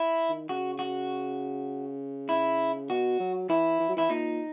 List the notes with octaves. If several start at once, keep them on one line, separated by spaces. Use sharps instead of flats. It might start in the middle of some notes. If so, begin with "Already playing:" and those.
Already playing: E4
D#3
C#3 F#4
F#4
E4
B2 F#4
F#3
E3 E4
E3
F#3
E3 E4
A#2 D#4